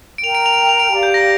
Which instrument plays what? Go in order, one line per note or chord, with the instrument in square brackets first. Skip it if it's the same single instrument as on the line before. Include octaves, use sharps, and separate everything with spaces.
[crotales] D7
[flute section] A#4 G5 A#5 [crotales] F7
[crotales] D7
F7
D7
F7
F7
D7
[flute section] G4 D5 F5
[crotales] G6
A#6